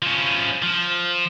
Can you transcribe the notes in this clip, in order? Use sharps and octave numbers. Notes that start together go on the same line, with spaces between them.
F3 C#4
F3